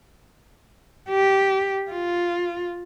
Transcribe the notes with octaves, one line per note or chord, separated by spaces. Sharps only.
G4
F4